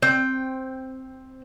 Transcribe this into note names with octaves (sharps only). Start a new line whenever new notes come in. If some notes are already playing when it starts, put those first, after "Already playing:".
C4 G5